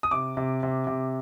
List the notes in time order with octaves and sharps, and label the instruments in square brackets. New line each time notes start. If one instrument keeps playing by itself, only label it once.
[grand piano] D#6
C3 D6
C3
C3
C3